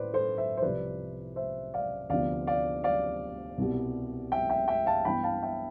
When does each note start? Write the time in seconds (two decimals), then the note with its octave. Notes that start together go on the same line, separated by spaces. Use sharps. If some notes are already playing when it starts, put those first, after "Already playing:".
Already playing: A2 B4 C5 D5
0.13 A4 C5
0.38 C5 E5
0.57 C5
0.62 C2 C3 F3 B4 D5
1.36 C5 E5
1.74 D5 F5
2.10 D2 C3 F3 B3 D5 F5
2.47 D5 F5
2.84 D5 F5
3.58 C2 B2 G3
4.32 E5 G5
4.50 E5 G5
4.68 E5 G5
4.86 F5 A5
5.05 G2 E3 B3 G5 B5
5.23 F5 A5
5.42 E5 G5